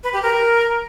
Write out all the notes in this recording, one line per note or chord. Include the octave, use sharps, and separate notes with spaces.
B4
G4
A#4